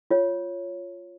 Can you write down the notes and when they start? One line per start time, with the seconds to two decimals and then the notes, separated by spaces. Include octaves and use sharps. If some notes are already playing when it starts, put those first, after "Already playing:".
0.11 F4 C#5